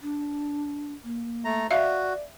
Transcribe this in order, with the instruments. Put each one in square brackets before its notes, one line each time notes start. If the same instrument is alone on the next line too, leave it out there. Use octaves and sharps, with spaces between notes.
[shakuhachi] D4
A#3
[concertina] A3 A#5
[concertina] F#4 [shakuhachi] D5 [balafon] E5 F5